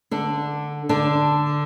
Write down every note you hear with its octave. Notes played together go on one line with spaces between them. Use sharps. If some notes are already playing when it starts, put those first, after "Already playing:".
D3 D4
D3 D4